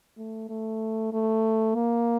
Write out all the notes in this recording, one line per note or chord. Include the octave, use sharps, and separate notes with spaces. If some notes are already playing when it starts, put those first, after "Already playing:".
A3
A3
A3
A#3